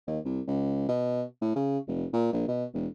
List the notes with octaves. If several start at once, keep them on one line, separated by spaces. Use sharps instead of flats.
D#2
C2
C#2
B2
A2
C#3
F1
A#2
A#1
B2
E1